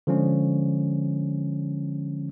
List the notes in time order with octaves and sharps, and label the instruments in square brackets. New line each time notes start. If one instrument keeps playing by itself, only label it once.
[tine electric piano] D3 F3 G#3 C#4